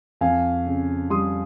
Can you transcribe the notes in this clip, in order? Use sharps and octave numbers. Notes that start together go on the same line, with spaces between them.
F2 F5 G#5
C#3
G3 C6 D#6